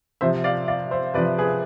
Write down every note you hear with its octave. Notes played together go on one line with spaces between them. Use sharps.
C3 F3 C5 E5
D5 F5
D5 F5
C5 E5
C3 F3 B4 D5
G#4 B4